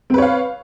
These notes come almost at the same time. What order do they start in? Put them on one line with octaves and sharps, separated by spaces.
C4 B4 C#5 F5